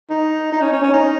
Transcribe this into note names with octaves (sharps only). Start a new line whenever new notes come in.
D#4
D#4
C#4
C#4
C#4
D#4